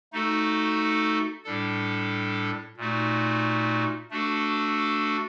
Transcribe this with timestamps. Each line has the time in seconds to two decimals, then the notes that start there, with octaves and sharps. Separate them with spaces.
0.13 A3 D#4 F#4 A4
1.44 A2 G3 D4 A4
2.77 A#2 A3 D#4 F#4
4.10 A3 D4 F#4 A4